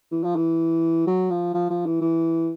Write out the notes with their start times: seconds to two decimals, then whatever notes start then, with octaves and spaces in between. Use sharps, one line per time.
0.12 E3
0.23 F3
0.36 E3
1.07 F#3
1.30 F3
1.54 F3
1.70 F3
1.86 E3
2.01 E3